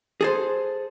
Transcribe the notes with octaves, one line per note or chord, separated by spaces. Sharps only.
G#4 A4 C5